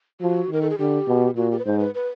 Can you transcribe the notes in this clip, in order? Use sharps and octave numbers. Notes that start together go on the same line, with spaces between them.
F3 F#4
D#3 A#4
A4
G#4
D3 G4
B2
A#2 F#4
G4
B4
G#2 C5
B4
B4